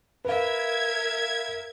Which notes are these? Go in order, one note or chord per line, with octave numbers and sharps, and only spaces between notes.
A#4 B4 E5 F5 G#6